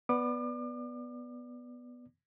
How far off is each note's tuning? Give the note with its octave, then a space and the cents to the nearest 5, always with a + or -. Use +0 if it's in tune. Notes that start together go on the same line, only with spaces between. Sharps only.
B3 +0 D5 +0 D6 +40